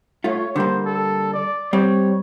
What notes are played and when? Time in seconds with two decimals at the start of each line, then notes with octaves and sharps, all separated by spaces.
0.24 A3 F4 C#5
0.56 D3 G3 A#3 C5
0.85 A4
1.33 D5
1.73 G3 C4 C#5